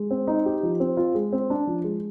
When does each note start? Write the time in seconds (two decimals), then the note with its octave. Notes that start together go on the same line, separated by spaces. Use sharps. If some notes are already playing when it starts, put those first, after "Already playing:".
Already playing: G#3
0.11 C4
0.27 D#4
0.46 G4
0.63 F3
0.80 C4
0.97 F4
1.15 G#3
1.33 C4
1.50 D4
1.67 F3
1.84 G#3